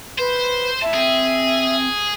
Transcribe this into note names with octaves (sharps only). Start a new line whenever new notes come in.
B4 C5
E4 E5 A5
C4 G#4